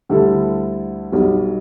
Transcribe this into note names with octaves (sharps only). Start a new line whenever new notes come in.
D2 D3 G3 E4 A4
B1 B2 G3